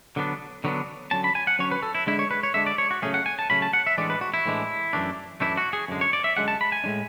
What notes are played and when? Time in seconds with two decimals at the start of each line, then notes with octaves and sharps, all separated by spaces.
0.16 D3 F#3 B3 D4
0.64 D3 F#3 B3 D4
1.11 D3 F#3 C#4 A5
1.24 B5
1.35 G#5
1.47 F#5
1.59 D3 F#3 C#4 C#5
1.71 B4
1.83 A4
1.95 E4
2.06 D3 G#3 D4 E4
2.19 C#5
2.31 B4
2.43 C#5
2.54 D3 G#3 D4 E5
2.66 D5
2.78 C#5
2.91 F#4
3.02 C#3 F#3 A3 C#4 G#4
3.14 F#5
3.26 G#5
3.39 A5
3.50 C#3 F#3 A3 C#4 B5
3.62 A5
3.73 F#5
3.87 E5
3.98 A2 E3 G#3 D4 D5
4.10 B4
4.21 F#4
4.34 E4
4.46 A2 E3 G#3 D4
4.93 F#2 E3 A3 D4
5.40 F#2 E3 A3 D4 E4
5.57 F#4
5.73 G#4
5.88 F#2 D3 G#3
6.01 C#5
6.13 D5
6.24 E5
6.37 F#2 D3 G#3 F#5
6.48 A5
6.61 B5
6.72 G#5
6.84 A2 G#3 D4